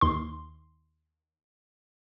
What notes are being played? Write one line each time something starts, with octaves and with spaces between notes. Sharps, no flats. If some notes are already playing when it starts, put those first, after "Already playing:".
D#2 C6